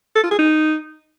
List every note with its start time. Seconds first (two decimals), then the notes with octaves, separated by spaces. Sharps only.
0.16 A4
0.24 F4
0.31 G#4
0.39 D#4